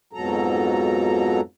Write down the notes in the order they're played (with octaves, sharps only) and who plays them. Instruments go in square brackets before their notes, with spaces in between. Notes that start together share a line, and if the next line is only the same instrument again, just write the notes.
[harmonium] F2 G#2 B2 F#3 A4 A#5